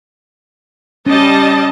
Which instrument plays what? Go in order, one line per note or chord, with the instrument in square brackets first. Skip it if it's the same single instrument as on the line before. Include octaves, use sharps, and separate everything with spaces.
[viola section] G3 D#5 A5 [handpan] C#4